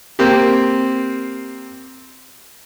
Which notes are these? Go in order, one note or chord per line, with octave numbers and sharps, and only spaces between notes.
A#3 C4 G4